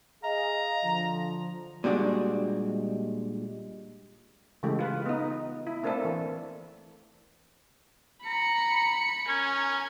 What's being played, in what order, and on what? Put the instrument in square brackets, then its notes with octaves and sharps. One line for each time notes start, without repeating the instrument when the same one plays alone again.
[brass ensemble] G#4 D#5 F5 [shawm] A#5
[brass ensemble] D3 F3
[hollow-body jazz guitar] A#2 G3 G#3 D4 F#4
[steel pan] C#3 E3 G#3 A3 G4
F4 B4
B3 D#4
E4
A3 A#3 C4 D4 E4 A4
E3
[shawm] A#5 [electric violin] B5 C#7
[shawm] C#4 [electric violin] A#4 G#5